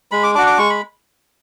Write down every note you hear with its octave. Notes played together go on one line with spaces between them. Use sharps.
G#3 B5
D6
D4 F#4 D6
D6
G#3 C#6
B5